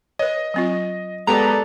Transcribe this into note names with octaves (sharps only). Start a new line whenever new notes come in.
B4 C#5 D#5
F#3 C4 F4
G#3 B3 G4 A4 D5 A#5